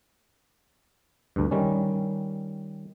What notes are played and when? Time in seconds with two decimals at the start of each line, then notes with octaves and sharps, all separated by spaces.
1.36 D2 G2
1.51 D#3 G3 C#4